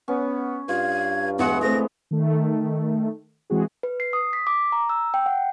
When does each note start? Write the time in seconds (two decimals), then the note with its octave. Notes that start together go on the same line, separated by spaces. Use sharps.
0.08 B3 C#4
0.69 G2 F4 G#6
1.39 E2 E3 G#3 B3 F#5
1.62 A3 C4 A#6
2.11 D#3 A3
3.50 E3 G#3 C4 F#4 G#4
3.83 B4
4.00 C7
4.13 D#6
4.33 B6
4.47 D6
4.72 A#5
4.90 E6
5.14 G5
5.26 F#5